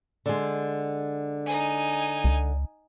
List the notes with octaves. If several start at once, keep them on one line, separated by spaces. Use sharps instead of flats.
D3 G#3
D#4 G#5
C#2